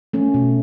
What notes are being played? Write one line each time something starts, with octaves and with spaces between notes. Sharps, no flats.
A3 C#4
B2